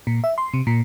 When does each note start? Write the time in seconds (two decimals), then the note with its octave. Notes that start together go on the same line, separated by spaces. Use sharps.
0.07 A#2
0.24 E5
0.38 C6
0.54 C3
0.67 A#2